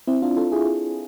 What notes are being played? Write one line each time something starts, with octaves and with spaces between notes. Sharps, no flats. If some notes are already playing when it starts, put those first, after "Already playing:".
C4 E4
D4 F4
F4 A4
E4 G#4